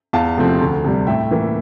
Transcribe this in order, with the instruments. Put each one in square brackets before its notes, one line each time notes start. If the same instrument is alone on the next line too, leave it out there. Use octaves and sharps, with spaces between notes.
[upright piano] E2 F5 A5
C3 F3 A3 C4
D2
C3 G3
A2 E5 G5
E3 A#3